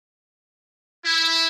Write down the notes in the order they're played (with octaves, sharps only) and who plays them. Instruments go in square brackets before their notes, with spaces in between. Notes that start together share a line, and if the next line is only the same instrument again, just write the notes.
[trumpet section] E4